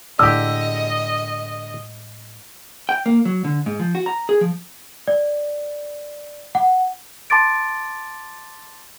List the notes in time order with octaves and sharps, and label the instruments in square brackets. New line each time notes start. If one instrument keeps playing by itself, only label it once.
[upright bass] A2 G#3 [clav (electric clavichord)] D3 G4 [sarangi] D#5 [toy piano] E6
[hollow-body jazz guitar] G5
A#3
F#3
D3
G#2
F3
F#4
A#5
G#4
F3
[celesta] D5
F#5
A5 C6 D6 A6 D7